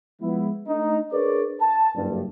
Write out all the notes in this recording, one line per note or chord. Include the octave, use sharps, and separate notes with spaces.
F3 G#3 B3 E4
A3 D4 D#4
D4 G#4 A#4 B4 C#5 D5
A5
F#1 G2